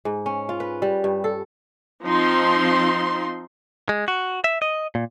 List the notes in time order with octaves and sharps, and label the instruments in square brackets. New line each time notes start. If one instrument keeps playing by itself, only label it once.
[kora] G#2
C#4
F4
B4
G3
G2
A4
[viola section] F3 C4 D#4 C6
[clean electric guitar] G#3
F#4
E5
D#5
A#2